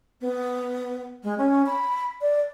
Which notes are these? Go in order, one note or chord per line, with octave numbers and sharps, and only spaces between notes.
B3
G#3
C#4
B5
D5